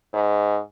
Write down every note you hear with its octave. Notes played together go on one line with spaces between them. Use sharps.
G#2